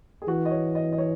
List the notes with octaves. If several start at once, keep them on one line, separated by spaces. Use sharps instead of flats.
G#4
E3 F#4
D#5
C#5
D#5
D#5
C#5